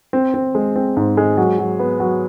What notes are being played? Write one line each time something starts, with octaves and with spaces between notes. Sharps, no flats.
C4
C4
G#3
C4
G#2
G#3
F#3
F#3
B3
F#3